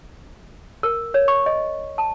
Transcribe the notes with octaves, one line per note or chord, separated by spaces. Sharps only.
A#4
C#5
C#6
D#5
A5